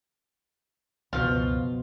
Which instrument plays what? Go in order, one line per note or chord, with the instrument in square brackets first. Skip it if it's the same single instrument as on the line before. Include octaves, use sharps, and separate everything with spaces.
[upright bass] C#2 F#2 [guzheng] B2 F3 [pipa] F4